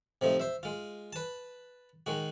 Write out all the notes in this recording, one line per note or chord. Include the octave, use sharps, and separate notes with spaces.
C3 F3 A3 D#4
C5 E5
G#3 F4
B4 A5
D#3 G#3 F#4